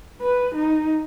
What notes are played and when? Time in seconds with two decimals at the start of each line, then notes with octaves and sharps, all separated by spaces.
0.22 B4
0.55 D#4